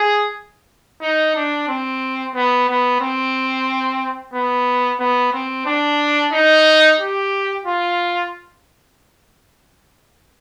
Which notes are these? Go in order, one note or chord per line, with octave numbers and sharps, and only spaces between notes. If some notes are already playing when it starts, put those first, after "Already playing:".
Already playing: G#4
D#4
D4
C4
B3
B3
C4
B3
B3
C4
D4
D#4
G4
F4